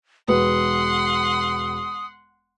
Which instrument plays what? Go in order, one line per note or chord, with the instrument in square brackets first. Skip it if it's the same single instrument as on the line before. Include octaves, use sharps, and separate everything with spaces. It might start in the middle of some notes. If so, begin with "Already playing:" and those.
[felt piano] E1 B4 [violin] F#5 C6 [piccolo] D#6